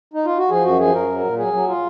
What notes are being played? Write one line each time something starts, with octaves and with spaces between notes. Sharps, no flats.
D#4
F4
F#4
F3 G#4
F#2 F#4
F3 G#4
F#2 A#4
F#3
A#2
F#3 G#4
F#3
F4